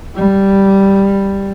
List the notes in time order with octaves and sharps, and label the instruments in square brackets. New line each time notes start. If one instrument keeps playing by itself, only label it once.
[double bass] G3